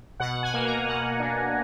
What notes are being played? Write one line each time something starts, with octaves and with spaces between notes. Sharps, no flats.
B2 F#5
G#5
A#3
A#5
B2 F#5
D4